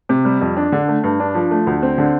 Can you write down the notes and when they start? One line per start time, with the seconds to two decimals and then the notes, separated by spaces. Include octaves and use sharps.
0.09 C3
0.25 G3
0.41 F2
0.57 D4
0.72 D3
0.88 A3
1.03 G2
1.20 D4
1.35 F3
1.51 A3
1.67 D2
1.82 C4
1.98 D3